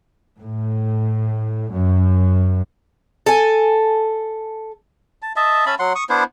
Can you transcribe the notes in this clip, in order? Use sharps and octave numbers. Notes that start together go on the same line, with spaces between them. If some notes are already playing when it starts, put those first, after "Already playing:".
A2
F#2
A4 G#5
A5
D#5 E5 A5
C#4 E5 A5 B5
F#3 F#5 C6
C#6 D#6
B3 D4 E4 C5